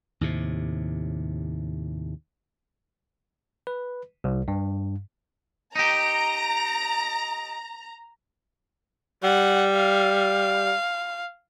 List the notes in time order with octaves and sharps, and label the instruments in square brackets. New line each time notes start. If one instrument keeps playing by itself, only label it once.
[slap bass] D#2 A2 C3
[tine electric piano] B4
C2
G2
[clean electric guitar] D#4 G4 [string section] A#5
[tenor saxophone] G3 [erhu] F#5
[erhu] F5